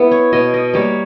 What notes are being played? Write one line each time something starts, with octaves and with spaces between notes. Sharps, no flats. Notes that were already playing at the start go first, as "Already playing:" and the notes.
Already playing: B3 E4
C#5
B2 D#5
D#5
G3 A#3 C#5